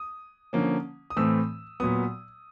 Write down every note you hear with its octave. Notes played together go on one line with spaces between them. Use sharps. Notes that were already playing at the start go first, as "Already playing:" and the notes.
Already playing: D#6
D3 F3 A#3 C#4
D#6
A2 E3 A3 C4 E6
A#2 F#3 B3 D#6